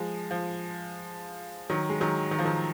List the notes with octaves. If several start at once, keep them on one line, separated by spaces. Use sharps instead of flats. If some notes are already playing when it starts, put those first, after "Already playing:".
Already playing: F3 G#3
F3
D#3 F#3
G#3
D#3 F#3
D#3
F3
D#3